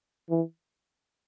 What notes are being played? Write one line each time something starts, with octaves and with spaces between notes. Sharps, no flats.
E3